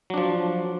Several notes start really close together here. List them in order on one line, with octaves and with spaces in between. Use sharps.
F#3 D4 F3